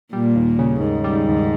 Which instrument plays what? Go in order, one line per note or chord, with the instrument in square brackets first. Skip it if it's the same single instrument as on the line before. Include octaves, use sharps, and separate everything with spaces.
[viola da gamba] A#2 [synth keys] G3
[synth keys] D#2
C#3
[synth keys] D#2 [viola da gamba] G#2
[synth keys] G3
D#2